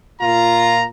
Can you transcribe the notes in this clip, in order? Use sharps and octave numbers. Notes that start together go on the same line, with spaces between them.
A#2 F4 A#5